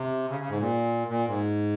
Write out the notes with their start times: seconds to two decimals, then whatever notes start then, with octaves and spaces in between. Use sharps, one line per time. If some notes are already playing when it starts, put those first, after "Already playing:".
Already playing: C3
0.30 C#3
0.40 C#3
0.49 G#2
0.60 A#2
1.08 A#2
1.27 G#2